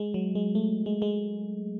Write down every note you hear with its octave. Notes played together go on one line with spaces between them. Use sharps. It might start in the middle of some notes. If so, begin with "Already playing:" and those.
Already playing: G#3
F#3
G#3
A3
G#3
G#3